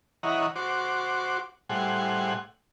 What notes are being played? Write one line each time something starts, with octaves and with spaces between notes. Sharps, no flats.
E3 C#5 D#5 F#5 A#5
F#4 C5 D6
A2 G3 C5 F#5 G#5